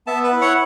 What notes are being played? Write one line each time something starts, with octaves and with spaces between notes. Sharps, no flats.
B3 E5 A5
B4
E4
C#5 F#5